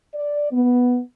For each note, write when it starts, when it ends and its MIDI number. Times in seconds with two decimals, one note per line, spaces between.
0.14 0.47 74
0.52 0.98 59